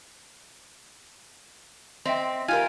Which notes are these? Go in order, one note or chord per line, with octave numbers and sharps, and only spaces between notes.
C4 D#5 E5 G5
F4 G4 A#4 G#5 F6 G#6